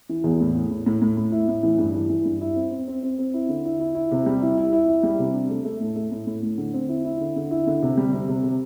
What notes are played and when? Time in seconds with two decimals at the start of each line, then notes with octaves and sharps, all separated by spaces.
0.09 E3
0.24 E2
0.40 A2
0.55 A2
0.71 A2
0.86 A2
1.02 A2
1.17 A2
1.32 E4
1.48 A2
1.63 E3
1.78 G2
1.94 E3
2.09 E3
2.25 G2
2.41 E4
2.56 C4
2.71 C4
2.88 C4
3.03 C4
3.19 C4
3.34 E4
3.49 D3
3.65 E4
3.80 E4
3.95 E4
4.11 C3
4.26 G3
4.42 E4
4.58 E4
4.73 E4
4.88 E4
5.03 G3
5.19 C3
5.34 D4
5.50 A3
5.65 A3
5.80 A2
5.96 A3
6.12 A2
6.27 A2
6.43 A2
6.58 D3
6.74 C4
6.89 E4
7.05 E4
7.21 D3
7.36 D3
7.51 E4
7.67 D3
7.82 C3
7.97 G3
8.12 C3
8.29 C3
8.43 C3